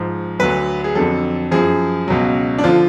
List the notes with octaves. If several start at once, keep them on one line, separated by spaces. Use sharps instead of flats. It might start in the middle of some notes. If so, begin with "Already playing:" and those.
Already playing: G#2 F3
D2 D3 F#3 B4
G#4
F2 D3 F#3 A4
F#2 F3 G#4
C#2 B2 F#3
D4
D3 F3 F4